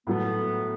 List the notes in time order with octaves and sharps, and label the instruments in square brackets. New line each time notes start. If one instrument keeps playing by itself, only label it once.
[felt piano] A2 F#3 A3 [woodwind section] B3